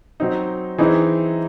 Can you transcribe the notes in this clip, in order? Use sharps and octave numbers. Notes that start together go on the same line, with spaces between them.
F#3 C4 D#4
E3 C4 D#4 G#4